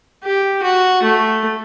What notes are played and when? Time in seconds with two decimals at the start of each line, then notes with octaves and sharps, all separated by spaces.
0.23 G4
0.63 F#4
1.03 A3